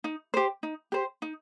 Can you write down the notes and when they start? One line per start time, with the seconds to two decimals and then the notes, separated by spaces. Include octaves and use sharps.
0.04 D#4
0.34 G4 C5
0.63 D#4
0.92 G4 C5
1.22 D#4